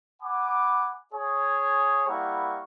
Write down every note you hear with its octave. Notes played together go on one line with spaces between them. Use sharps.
F#5 G#5 B5 D6
G#4 C#5
G3 A#3 E4 A#4 F#5 C#6